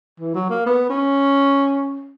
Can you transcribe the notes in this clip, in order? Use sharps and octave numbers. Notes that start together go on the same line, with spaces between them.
E3
F#3
A#3
B3
C#4